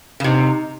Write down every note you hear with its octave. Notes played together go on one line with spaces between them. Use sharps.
C#3
C3 D#4